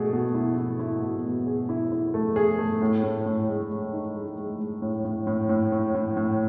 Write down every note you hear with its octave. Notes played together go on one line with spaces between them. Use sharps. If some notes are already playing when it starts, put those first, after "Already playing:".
Already playing: B2 A3 G#4
B2
E4
E4
E4
B2
B2
G#4
E4
E4
A3
G#4
A3
A2
A2
A2
G#3
G#3
D#4
G#3
G#3
G#3
A2
A2
A2
A2
A2
A2
A2